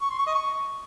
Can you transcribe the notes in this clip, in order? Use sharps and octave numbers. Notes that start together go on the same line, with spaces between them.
C#6
C6
C#6
D#5
C#6